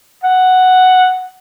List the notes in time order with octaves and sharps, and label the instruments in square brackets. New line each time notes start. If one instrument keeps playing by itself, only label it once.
[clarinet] F#5